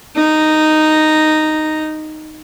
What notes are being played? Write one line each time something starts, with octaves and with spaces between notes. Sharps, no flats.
D#4 A#5